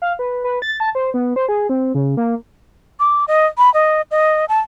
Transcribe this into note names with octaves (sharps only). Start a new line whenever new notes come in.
F5
B4
B4
A6
A5
C5
B3
C5
G#4
C4
C#3
A#3
D6
D#5
B5
D#5
D#5
A5